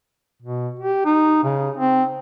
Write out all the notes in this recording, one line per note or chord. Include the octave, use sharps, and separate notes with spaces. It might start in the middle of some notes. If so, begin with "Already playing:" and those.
B2
G4
D#4
C#3
C4